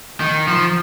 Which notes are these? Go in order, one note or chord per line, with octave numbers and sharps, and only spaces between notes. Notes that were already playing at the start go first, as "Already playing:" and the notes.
D#3
F3